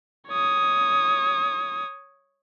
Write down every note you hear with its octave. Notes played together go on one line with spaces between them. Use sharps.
C#5 D#6